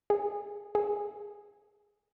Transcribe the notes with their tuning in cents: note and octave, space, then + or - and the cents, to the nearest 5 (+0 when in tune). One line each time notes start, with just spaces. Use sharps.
G#4 -25
G#4 -10